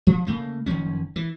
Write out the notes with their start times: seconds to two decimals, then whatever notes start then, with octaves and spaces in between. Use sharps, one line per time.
0.07 F3
0.26 C#3 A3 A#3
0.66 F#1 D#3 F3 C#4
1.16 E3